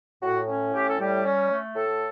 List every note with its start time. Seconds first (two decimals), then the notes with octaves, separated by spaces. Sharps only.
0.23 A2 F#4
0.48 C#4
0.73 A2 G4
0.86 A4
0.99 G3 G4
1.24 C#4
1.50 A3
1.75 A2 A4